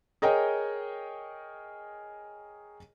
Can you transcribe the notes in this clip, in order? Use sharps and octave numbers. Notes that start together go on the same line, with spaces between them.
G#4 A#4 C#5 D#5 G5